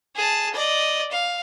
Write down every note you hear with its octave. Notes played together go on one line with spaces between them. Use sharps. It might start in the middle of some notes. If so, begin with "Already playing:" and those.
G#4 A5
D5 D#5
F5